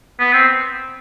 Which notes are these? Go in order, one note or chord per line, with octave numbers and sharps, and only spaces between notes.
B3
C4